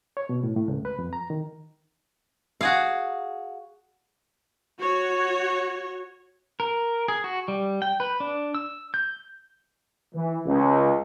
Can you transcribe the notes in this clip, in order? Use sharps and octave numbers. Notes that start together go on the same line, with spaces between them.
C#5
B2
A2
A2
C#2
B4
F2
A#5
D#3
F#4 G#4 F5
F#4 C#5
A#4
G#4
F#4
G3
G5
B4
D4
E6
G6
E3
C#2